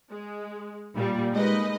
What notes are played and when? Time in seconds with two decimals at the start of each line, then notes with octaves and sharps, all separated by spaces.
0.10 G#3
0.93 A#2 G3
1.33 G#3 A#3 D#4 B4 D#5